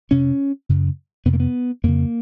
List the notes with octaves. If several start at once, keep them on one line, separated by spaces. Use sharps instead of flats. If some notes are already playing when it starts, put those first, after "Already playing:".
F2 C3 C#4
F#2 C#3
F2 C3 B3
A#3
B3
F2 C#3 A#3